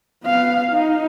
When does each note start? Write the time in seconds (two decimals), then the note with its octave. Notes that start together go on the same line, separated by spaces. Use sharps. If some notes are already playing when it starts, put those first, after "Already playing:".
0.23 B3 F5
0.71 D#4